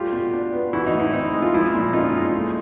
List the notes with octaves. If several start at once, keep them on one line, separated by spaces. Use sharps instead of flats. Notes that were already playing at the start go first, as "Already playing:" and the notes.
Already playing: G3 A3 F4 G4
B2
D4
B3
E3 E4 F#4
D#4
A2
E4
C4 D#4
G#3
F4
F3 E4
A#2
C#4 D#4 F4
G#3
A3